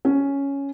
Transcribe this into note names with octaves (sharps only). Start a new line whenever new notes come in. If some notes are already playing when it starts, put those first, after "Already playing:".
C#4